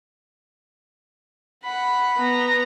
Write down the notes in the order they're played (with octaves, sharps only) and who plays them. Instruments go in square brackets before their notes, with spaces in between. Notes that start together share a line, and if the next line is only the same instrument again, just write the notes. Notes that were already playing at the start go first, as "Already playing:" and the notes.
[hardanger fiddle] F#5 B5
[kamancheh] B3 A#5